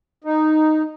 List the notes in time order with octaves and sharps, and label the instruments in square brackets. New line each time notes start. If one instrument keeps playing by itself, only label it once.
[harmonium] D#4